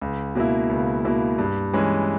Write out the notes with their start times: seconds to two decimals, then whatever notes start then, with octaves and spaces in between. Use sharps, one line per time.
0.01 C#2
0.35 B2 A#3 E4
0.69 C#2
1.05 B2 A#3 E4
1.38 G2
1.73 E3 G#3 C#4